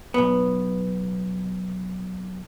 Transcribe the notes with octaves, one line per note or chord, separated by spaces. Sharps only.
B1 B3